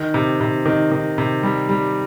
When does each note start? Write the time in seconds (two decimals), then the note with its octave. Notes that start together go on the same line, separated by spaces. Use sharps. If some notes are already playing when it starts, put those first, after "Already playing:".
Already playing: D#3
0.14 C3
0.41 C3
0.66 D#3
0.92 D#3
1.18 C3
1.43 G3
1.69 G3